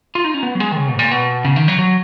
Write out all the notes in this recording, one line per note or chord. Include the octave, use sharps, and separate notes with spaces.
F4
D#4
C#4
B3
F#3
G#3
D#3
C#3
B2
G#2
A#2
B2
C#3
D#3
F#3
F#3